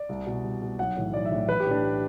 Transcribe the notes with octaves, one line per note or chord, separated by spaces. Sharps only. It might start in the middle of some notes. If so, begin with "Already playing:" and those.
Already playing: D5
C2
B2
C2
B2
B1 F#5
A2 E3
B1 D5
E5
A2 E3
A1 B4
G4
A2 E3 D4